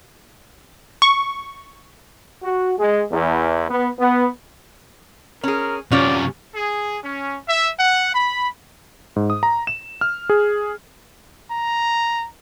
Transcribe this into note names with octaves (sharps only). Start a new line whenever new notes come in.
C#6
F#4
G#3
E2
B3
B3
C#4 G#4 A#4
F#2 C3 C#4 F4 C#5 D5
G#4
C#4
E5
F#5
B5
G#2
D#6
A#5
E7
F6
G#4
A#5